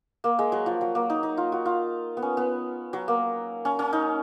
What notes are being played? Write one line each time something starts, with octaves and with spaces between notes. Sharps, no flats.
A#3
G#3
F#3
F3
F#3
A#3
D#4
D#4
F4
F#4
F4
B3
C#4
B3
F#3
A#3
C#4
C#4
D#4